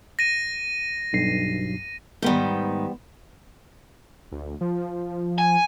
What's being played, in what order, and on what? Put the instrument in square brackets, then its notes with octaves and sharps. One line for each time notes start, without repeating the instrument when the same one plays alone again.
[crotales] A#6 D#7
[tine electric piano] B1 G2 C7
[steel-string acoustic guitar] G#2 D#3 [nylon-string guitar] G3 B3 C5
[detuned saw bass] D2
F3
[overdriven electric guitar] G#5